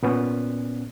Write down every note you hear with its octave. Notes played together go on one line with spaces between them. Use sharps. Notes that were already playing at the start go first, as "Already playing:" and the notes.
A#2 B3 C#4